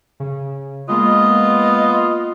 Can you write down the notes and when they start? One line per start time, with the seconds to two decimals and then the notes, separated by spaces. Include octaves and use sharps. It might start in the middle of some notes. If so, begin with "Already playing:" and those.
0.20 C#3
0.89 G#3 A#3 B3 F4 D#5